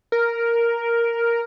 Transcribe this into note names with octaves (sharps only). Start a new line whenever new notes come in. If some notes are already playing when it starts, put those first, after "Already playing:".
A#4